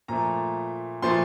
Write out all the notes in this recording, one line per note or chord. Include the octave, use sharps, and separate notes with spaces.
A#2 F3 A3 A#5
A#2 F3 A3 C6